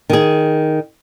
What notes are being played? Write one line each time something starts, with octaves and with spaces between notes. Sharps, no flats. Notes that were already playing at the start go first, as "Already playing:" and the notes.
D#3 G#4